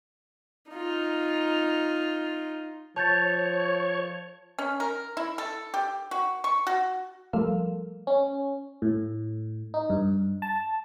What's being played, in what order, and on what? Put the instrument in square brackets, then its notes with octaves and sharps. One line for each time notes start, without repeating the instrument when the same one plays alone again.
[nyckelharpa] D#4 F4
[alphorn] F3 [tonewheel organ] C#5 [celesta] A5 G6 A6
[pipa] C#4
A#4
E4
A4
G4
F#4
C#6
F#4
[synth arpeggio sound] F3 G3 A3 A4 A#4 F5
[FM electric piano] C#4
A2
D#4
G2
A5